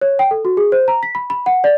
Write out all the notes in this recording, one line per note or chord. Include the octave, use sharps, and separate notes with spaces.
C#5
G5
A4
F#4
G#4
C5
A#5
B6
B5
B5
F#5
D5